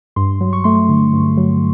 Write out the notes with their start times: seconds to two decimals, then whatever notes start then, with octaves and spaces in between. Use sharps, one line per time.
0.16 G2 C6
0.41 F#3
0.53 C#6
0.64 A3 C6
0.75 C#6
0.89 D3
1.13 G2
1.37 F#3